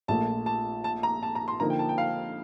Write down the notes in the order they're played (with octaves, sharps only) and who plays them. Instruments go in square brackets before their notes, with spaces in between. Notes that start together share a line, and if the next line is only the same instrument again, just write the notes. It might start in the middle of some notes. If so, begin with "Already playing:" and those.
[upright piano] A#1 A#2 A3 [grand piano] A5
[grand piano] A5
A5
A#5
A5
A#5
C6
[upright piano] D3 F3 A#3 D#4 [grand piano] A#5
[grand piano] G5
A5
G5
F5